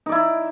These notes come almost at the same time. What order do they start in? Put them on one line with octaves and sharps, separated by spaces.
D#4 D5 E4